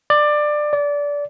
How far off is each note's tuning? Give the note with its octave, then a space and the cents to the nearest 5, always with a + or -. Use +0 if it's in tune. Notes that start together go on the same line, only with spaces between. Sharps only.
D5 +20
D5 -20